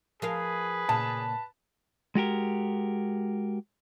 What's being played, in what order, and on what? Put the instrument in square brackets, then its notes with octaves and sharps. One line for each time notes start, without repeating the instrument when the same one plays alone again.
[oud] F3 A#4 F5 [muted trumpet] G#4 [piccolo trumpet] B4
[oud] A#2 C#3 [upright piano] A5
[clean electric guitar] G#3 F#4 G4 A#4